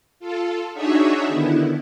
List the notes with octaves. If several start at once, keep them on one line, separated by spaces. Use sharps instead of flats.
F4 A4
D4 D#4 F#4 G#4 C#5 E5
D3 D#3 B3 E4